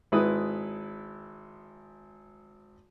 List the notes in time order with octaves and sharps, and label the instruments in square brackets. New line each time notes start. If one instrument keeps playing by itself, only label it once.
[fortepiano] G#1 G#3 E4 B4 D#6